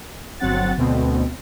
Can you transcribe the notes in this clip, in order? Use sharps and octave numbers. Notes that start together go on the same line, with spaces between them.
G1 F#3 C4 F#5 A6
D2 B2 C4